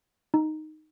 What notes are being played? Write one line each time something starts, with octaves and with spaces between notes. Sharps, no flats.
D#4